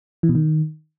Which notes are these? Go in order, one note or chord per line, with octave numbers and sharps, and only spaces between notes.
E3
B2
D#3